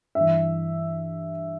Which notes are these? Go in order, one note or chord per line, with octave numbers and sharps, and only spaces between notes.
G2 E3 E5